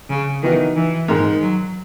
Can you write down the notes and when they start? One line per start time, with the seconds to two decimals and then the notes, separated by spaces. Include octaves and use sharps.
0.09 C#3
0.42 D#3 E3 B3 D#4 F#4
0.75 E3
1.08 G#2 D#3 G#3
1.41 F#3